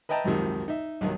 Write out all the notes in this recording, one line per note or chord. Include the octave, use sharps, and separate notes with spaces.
B4 D#5 E5 G5 A5 A#5
G#1 C#2 F#2 C3 D#3 F3
D#4 E5
B1 G2 D#3 F#3